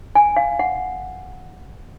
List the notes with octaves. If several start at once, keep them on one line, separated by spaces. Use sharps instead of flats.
G#5
F5
F#5